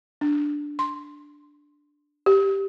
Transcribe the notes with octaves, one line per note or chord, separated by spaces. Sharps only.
D4
C6
G4